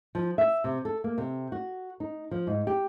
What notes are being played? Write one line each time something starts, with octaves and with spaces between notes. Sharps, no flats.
F3
E5
C3
A4
A#3
C3
F#4
D#4
F3
G#2
G4